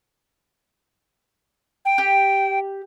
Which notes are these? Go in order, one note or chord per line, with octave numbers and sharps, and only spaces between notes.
G5
G4